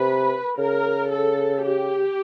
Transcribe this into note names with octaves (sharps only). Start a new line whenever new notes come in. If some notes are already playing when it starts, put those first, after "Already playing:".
Already playing: C3 B4
C#3 A#4
A4
G4